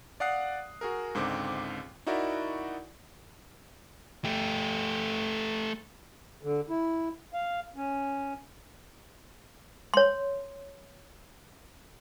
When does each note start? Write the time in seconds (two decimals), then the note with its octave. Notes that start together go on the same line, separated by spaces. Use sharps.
0.20 D5 F5 F#5 D#6 F#6 C7
0.81 F#4 G#4 A#4
1.15 C#2 G#2 D3 C4 D6
2.07 D#4 E4 F#4 A#4 D5 E5
4.25 A3 G4
6.43 D3
6.69 E4
7.33 F5
7.76 C#4
9.94 C#5 C6